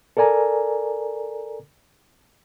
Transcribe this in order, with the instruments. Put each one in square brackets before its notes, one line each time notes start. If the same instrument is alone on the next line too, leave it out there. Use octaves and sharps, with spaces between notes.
[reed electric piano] A4 A#4 D5 G#5 A#5